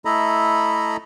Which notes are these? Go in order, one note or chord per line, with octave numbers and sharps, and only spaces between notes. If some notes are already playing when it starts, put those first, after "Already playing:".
A3 E4 A4 D#5 A#5 B5